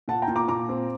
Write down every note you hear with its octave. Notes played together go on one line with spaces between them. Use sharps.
A#2 F#5 A5
G5 A#5
A#2
A#5 D6
A#2 A#5 D6
C4